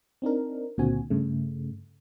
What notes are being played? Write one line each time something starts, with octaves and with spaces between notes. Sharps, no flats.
C4 D4 D#4 A#4
C#2 A#2 D3 C4 F#4 G#5
G2 C#3 A3